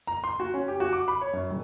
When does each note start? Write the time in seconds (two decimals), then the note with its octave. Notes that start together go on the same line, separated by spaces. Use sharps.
0.07 A#5
0.24 C6
0.40 F#4
0.54 C#4
0.68 G4
0.80 F#4
0.93 D6
1.08 B5
1.21 C#5
1.33 F#2
1.50 D#1